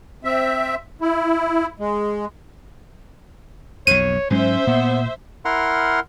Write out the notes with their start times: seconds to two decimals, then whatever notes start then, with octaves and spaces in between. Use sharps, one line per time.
0.24 C4 E5
1.01 E4
1.79 G#3
3.87 B1 F2 C#5 D#7
4.30 G#2 F#3 G#3 C#4 C5 E5
4.67 A#2 B3
5.45 E4 A#4 F#5 C6 F6